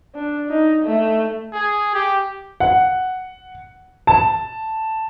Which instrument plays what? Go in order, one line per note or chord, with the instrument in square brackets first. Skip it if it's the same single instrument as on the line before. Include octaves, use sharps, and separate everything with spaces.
[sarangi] D4
D#4
A3
[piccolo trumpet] G#4
G4
[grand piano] F#5
A5